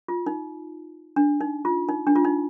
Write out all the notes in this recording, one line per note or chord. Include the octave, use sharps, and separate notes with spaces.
F4
D#4
D4
D#4
F4
D#4
D4
F4
D#4